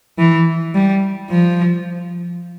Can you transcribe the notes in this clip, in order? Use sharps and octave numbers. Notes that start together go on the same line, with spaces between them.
E3
G3
F3